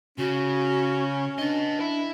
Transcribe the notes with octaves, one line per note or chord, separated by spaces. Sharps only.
C#3 C#4 F#4
D4 B4 D#5
E4